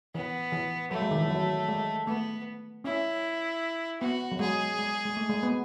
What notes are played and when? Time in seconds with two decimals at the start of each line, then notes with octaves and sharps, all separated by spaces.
0.15 E3 B3
0.53 E3
0.91 F#3 A3
1.02 G#3
1.11 D#3
1.21 E3
1.31 F#3
1.68 G#3
2.07 A3 B3
2.84 C#4 E4
4.01 B3 F#4
4.32 F#3
4.39 G#3 G#4
4.79 G#3
5.05 G#3
5.17 A3
5.29 G#3
5.43 B3